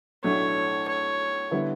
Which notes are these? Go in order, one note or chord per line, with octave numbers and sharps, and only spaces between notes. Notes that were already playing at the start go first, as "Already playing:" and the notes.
B1 A2 F#3 A3 D4 C#5
C#5
D3 G3 B3 E4